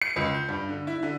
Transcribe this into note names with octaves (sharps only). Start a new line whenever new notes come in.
C#7
C#2
G6
G2
D3
E4
D3